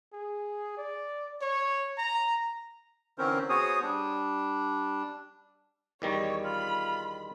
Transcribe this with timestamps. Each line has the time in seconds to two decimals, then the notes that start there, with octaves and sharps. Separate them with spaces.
0.13 G#4
0.78 D5
1.42 C#5
1.98 A#5
3.18 D3 E3 C4 C#4 A#4 C5
3.49 B3 F#4 G#4 C5 C#5 D#6
3.82 G3 D4
6.02 E2 D#3 G3 C#5
6.44 F4 B5